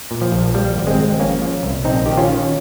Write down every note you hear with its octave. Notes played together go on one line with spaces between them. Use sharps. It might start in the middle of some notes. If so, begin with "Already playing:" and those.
A#2
F3
A#1
F3 G3
G#1
G#3 C4
G#1
F3 A#3 C#4
F3
C2
A#1 C4 D#4
D#3 G4
C#4 F4
D#3